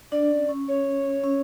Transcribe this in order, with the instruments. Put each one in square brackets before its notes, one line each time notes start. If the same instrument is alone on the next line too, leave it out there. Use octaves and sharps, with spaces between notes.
[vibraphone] D4 [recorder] D5
[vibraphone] C#4
C#4
[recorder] C#5
[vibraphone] C#4